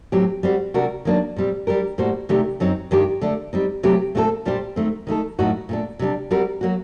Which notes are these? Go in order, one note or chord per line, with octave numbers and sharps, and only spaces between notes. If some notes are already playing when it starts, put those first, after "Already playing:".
A2 F#3 C4 G4
G3 C4 F#4 C5
C3 G3 D4 F#4 A#4
D#3 F#3 A#3 D4
A#2 G3 C4
G3 D4 G4 A#4
A2 G3 A#3 F#4 C5
C3 D#3 A3 D4 G4
F#2 F#3 C4 D#4
G2 D#3 G3 D4 G4
D3 A3 D4
G3 C4 D#4
C3 F#3 A3 C4 G4
A#2 A3 C4 F#4 A4
A#2 G3 D4 G4 C5
D#3 A3 C4
D#3 A3 D#4 A4
A2 F#3 A#3 D#4 F#4
A#2 A3 D4
C3 G3 D4
G3 C4 F#4 A#4
F#3 A#3 F#4